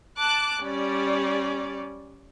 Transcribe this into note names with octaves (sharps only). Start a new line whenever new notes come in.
A5 D6 F#6
G3 C#4 D5